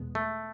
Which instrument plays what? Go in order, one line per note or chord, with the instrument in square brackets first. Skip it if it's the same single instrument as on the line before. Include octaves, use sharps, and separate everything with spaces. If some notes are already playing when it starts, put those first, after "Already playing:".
Already playing: [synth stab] E2 B2 G#3 B3
[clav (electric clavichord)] A3